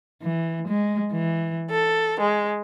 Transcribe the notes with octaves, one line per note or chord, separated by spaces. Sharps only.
E3
G#3
E3
A4
G#3